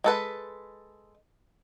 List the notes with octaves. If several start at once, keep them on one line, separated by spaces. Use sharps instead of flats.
G#3 A4 B4